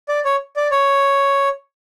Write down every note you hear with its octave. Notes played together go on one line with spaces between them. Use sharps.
D5
C#5
D5
C#5